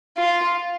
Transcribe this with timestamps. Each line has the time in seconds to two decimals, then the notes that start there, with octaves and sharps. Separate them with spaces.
0.17 F4